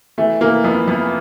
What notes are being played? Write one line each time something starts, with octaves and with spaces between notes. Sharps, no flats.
E3 A3
E3 A#3
F2 B3
F2 B3